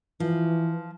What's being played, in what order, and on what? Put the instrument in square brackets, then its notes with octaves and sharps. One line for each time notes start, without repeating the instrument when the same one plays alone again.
[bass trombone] E3 [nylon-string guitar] F3